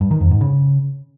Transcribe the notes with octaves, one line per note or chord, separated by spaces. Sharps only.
G2
D#3
F2
G#2
C#3